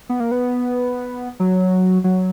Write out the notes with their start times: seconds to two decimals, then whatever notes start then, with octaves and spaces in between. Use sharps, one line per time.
0.09 B3
0.20 A#3
0.31 B3
1.40 F#3
2.04 F#3